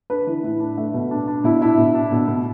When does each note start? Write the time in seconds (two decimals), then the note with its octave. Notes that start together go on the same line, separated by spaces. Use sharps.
0.10 D4 B4
0.27 E3
0.43 A2
0.60 D4
0.77 A3
0.94 B2
1.11 D4
1.28 D4
1.44 B2 E4
1.61 D4 E4
1.78 B2
1.95 D4
2.12 B2
2.28 B2